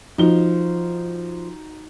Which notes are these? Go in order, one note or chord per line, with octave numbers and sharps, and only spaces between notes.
F3 D#4 F#4 G7